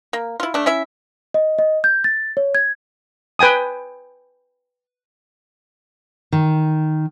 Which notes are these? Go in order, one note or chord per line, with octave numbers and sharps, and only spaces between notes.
A#3
E4 F4
A3 D4
C#4 E4 E5
D#5
D#5
G6
A6
C#5
G#6
B4 G5 G#5 D#6
D#3